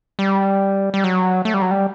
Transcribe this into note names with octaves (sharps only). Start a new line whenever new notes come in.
G3
G3
F#3
A3
G3
F#3
G3